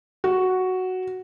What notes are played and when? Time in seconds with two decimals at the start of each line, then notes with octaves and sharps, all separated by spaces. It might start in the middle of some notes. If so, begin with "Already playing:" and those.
0.24 F#4